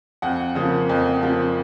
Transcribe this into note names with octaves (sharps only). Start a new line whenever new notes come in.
F2 F#5
C#3 F3 A#3
F2
C#3 F3 A#3